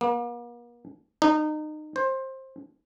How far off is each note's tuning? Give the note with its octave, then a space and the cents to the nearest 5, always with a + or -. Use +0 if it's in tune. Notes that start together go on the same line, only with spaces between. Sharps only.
A#3 +45
D#4 -25
C5 +20